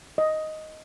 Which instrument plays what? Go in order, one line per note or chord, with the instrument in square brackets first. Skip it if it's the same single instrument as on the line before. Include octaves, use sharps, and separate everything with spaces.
[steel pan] D#5